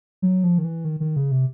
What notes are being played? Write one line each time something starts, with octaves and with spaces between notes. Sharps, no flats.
F#3
F3
D#3
E3
D#3
D#3
C#3
C3